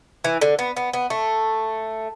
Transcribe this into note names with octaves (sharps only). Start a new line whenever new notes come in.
E3
D3
B3
B3
B3
A3